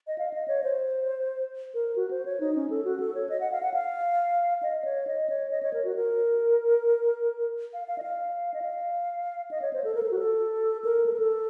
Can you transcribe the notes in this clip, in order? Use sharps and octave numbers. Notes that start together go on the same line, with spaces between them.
D#5
F5
D#5
C#5
C5
A#4
F#4
C5
C#5
D#4
C#4
A4
F#4
A4
C#5
D#5
F#5
F5
F#5
F5
D#5
D#5
C#5
D#5
C#5
D#5
C#5
A#4
F#4
A#4
F5
F5
D#5
F5
D#5
F5
D#5
C#5
C5
A4
A#4
A4
F#4
A4
A#4
A4
A#4
A4